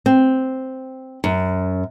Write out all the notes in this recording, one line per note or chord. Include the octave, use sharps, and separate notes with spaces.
C4
F#2